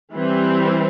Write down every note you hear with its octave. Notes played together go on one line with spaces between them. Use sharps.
E3 G3 C4